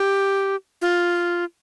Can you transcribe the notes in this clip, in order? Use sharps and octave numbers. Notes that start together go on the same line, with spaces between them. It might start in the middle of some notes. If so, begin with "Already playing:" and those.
Already playing: G4
F4